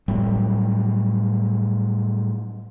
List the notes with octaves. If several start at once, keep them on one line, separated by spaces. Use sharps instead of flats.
A2 F#3 G3